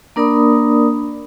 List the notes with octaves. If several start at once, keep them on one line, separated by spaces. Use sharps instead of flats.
A#3 D4 A#4 D5 B5 D#6